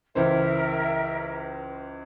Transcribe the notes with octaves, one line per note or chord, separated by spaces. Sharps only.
C#2 E3 A#4 C5 E5